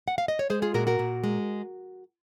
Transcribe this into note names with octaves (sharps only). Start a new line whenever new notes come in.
F#5
F5
D#5
C#5
G#3 G#4 C5
F4 G#4
A#2 F#4 A#4
F#4 A#4
A#2
G#3